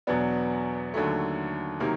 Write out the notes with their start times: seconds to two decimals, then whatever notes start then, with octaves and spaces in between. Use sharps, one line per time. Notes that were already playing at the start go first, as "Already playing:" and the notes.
0.07 E2 B2 F#3 B3 D4
0.94 D#2 D3 F#3 A3
1.80 C3 D#3 F#3 A#3